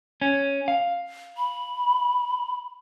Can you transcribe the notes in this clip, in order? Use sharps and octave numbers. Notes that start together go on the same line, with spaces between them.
C#4
F5
B5